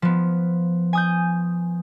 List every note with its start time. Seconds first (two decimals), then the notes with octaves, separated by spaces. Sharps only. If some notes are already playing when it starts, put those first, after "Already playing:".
0.02 F3 B3
0.93 G#5 D#6 G6